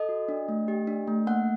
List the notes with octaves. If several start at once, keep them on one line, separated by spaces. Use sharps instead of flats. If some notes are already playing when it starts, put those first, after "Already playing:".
Already playing: A4 D#5
F#4
D4
A3
G4
D4
A3
A#3 F#5